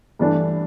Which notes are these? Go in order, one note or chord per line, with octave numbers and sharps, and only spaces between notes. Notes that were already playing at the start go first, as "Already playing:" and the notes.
G2 E3 A3 D4